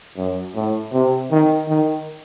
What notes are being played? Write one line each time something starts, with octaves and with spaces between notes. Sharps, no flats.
F#2
A2
C3
D#3
D#3